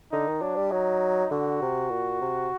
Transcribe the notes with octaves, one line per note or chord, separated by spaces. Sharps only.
D3 D#4
D#3
F#3 D4
G3
F#3 D#4
D3 F#4
C3
A#2
C3